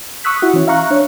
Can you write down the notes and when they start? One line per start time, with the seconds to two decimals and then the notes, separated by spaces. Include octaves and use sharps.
0.24 C#6 D#6 E6 F#6 B6
0.42 E4 F#4
0.54 E3 C#4
0.67 E5 F5 A#5 C#6 F#6
0.91 D4 C#5